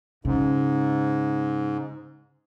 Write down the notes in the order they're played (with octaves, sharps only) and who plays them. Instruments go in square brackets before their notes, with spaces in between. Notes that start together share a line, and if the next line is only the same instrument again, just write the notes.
[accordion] G#2 [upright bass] C#3